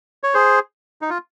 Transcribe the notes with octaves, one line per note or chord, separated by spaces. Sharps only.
C#5
G#4 C5
D#4
F4